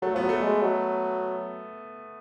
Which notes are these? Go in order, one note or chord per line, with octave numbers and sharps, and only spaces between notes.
F#3 A3
F3 B3
F#3
A3
G#3
F#3